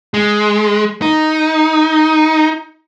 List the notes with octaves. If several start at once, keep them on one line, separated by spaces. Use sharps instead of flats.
G#3
D#4